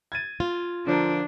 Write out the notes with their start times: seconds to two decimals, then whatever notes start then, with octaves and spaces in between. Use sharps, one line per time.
0.12 G#6 A6 D#7
0.40 F4
0.87 D3 F3 D4 A#4